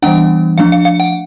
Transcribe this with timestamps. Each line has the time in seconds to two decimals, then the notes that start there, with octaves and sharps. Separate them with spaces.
0.02 E3 G3 B3 D4 F#5
0.58 F3 A3 D4 F5
0.72 F5
0.85 F5
1.00 F#5